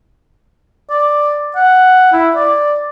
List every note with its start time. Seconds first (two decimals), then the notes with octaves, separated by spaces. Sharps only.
0.90 D5
1.56 F#5
2.12 E4
2.35 D5